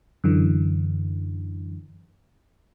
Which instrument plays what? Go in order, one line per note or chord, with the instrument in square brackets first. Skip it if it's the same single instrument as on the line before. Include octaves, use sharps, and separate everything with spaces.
[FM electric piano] F#2 D3 E3